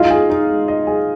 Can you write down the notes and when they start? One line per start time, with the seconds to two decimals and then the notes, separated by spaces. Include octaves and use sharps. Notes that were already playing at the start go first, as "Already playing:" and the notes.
Already playing: G#3 D#4 F4 D#5
0.10 G#4
0.30 D#4
0.49 G#3
0.68 D#5
0.87 G#4